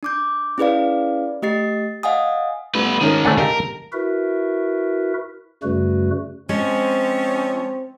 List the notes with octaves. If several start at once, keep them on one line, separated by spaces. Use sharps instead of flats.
D4 D6 G6
C#4 E4 G#4 B4 D5 F5
A3 G4 D#5 A6 C7
D#5 F5 F#5 G#5 D#6
G3 A3 B3 B4
D#3 G#3 C#4 D#4 A#4
A3 D4 F#5 G#5 A5
G4 A#4 D#5 F5
E4 F#4 A#4 B4 E5
F#2 C#3 G3 A3 F#4 B4
F3 G#3 C4 C#4